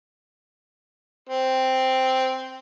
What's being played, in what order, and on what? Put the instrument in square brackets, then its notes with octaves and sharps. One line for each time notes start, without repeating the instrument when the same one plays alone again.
[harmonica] C4